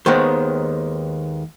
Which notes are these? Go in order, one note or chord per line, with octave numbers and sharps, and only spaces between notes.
D#2 D#3 G#3 B3 C5